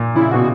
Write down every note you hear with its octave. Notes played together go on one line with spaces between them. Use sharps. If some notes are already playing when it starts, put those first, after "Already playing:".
Already playing: A#2
C#3 E4
B2 F#4